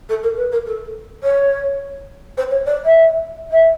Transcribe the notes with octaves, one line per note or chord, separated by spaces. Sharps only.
A4
A#4
B4
A#4
A4
C#5
C5
C#5
D5
E5
E5